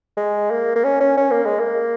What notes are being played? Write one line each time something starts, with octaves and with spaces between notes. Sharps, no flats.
G#3
A#3
A#3
C#4
C#4
C#4
A#3
G#3
A#3